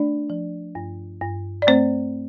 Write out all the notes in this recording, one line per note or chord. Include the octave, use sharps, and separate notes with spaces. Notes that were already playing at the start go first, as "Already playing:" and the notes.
Already playing: A3 D4 D5
F3
G2
G2
D5
A3 C4 C5